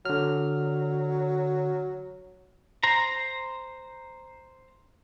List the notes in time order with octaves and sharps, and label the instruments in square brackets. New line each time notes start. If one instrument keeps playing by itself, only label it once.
[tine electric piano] D3 F6 [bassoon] F#3
[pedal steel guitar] C5 A#5